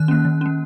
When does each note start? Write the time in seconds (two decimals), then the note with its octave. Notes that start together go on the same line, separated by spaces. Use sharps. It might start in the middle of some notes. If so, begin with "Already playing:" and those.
Already playing: D#3 F#6
0.08 A#3 C#4
0.25 D#3
0.41 A#3 C#4